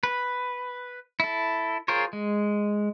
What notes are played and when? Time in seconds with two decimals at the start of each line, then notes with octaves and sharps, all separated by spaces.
0.03 B4
1.20 E4 A4
1.88 F4 G#4 A#4 C5 C#5
2.13 G#3